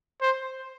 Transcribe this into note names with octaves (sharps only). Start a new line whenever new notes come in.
C5